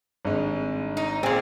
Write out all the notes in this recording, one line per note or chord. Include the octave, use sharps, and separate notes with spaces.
G#1 G3 G#3 C4 D4
D#4
A#2 C4 G#4 C5 F5